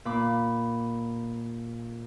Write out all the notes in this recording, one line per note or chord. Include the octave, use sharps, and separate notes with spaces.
A#2 B5 D6